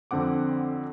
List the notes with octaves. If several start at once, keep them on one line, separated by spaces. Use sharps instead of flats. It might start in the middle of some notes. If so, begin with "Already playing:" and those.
F2 D3 C4 F#5 D6